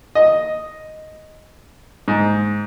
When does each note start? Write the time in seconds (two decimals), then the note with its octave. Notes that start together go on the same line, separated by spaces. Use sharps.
0.15 D#5
2.08 G#2